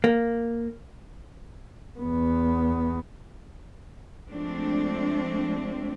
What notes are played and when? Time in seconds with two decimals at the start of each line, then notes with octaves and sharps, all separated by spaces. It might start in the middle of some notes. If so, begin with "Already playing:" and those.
0.04 A#3
2.00 E2 B3
4.30 F3 G#3 A3 C4 D4